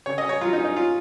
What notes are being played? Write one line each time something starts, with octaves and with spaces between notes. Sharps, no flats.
C#3 C#5
D#5
C#4
C#5
F#3 F4
D#4
C#4
D#4
C#4 F4